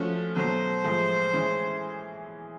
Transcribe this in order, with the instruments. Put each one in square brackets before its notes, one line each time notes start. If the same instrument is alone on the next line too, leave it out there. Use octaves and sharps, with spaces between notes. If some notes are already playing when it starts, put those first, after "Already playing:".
Already playing: [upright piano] F3 A3 C#4 [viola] F#4
[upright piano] B2 F#3 A3 [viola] C5
[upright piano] A2 F3 G#3
E3 G#3 C#4